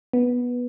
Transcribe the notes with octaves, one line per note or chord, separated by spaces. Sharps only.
B3